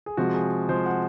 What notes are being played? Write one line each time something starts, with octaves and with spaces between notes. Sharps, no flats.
G#4
C3 F3 G#3 F#4
G#4
C3 F3 G#3 C5
F#5